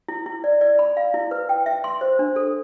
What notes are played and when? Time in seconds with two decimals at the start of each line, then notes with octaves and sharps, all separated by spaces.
0.08 E4
0.26 E4
0.44 D5
0.61 D5
0.79 B5
0.97 F5
1.14 E4
1.31 B4
1.49 G5
1.66 E5
1.84 C6
2.01 C5
2.19 D4
2.36 A4